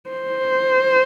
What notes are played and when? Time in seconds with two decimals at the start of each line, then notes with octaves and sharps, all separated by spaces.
0.10 C5